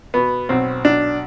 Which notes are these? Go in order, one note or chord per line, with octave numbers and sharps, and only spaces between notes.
B2 B3
B1 C4
B1 D4